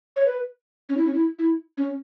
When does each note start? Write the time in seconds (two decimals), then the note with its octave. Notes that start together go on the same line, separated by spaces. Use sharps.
0.16 C#5
0.26 B4
0.89 C#4
0.97 E4
1.06 C#4
1.14 E4
1.39 E4
1.77 C#4